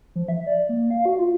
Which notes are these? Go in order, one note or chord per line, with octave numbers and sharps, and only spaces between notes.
F3
E5
D5
A#3
F5
F#4
F4